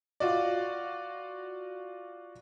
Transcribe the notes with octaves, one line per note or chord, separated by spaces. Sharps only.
F4 F#4 D5